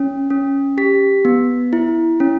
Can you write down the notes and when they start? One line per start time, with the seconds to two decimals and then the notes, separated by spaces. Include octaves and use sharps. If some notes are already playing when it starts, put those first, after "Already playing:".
Already playing: C#4
0.30 C#4
0.78 G4 B6
1.25 B3
1.73 E4
2.20 C#4